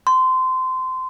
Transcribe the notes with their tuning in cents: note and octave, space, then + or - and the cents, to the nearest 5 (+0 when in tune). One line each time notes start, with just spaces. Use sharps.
C6 -20